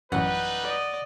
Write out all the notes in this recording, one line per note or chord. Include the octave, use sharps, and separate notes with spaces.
A1 F#2 G3 D#4 B4 F#5
D5 D#5